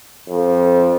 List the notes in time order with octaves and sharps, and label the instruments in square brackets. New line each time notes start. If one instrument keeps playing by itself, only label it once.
[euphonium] F2